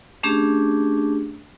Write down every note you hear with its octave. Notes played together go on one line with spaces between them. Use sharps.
A3 C#4 D4 G4 G#4